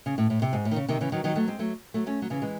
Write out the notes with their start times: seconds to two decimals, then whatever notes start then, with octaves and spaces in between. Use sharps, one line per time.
0.06 C#3
0.18 A2
0.30 A2
0.42 C3
0.53 G#2
0.65 A2
0.71 D#3
0.76 C#3
0.88 C3 D#3
1.01 C#3 E3
1.12 D#3 F#3
1.24 D#3 F#3
1.35 F#3 A3
1.48 G#3 C4
1.59 F#3 A3
1.94 F#3 A3
2.06 A3 C#4
2.22 F#3
2.30 C#3 E3
2.42 E3 G#3